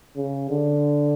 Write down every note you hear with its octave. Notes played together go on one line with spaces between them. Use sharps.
C#3
D3